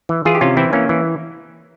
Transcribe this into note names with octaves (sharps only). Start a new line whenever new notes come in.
E3
E3 F4 G#4
G4
C3 C#4 F4
E3 C4 E4
E3 A#3 C#4
E3